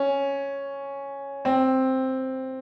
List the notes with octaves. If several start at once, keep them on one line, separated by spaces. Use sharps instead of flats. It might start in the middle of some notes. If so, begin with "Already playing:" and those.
Already playing: C#4
C4